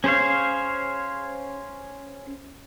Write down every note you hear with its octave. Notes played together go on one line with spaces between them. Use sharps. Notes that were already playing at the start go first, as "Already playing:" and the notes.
C#4 G#4 C5 C#5 F5